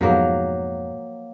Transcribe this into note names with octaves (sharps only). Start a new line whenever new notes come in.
F2 G#2 B2 F3 F#3 A#3